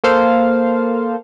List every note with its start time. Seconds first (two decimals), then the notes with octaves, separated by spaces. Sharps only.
0.04 A#3 A4 C5 F5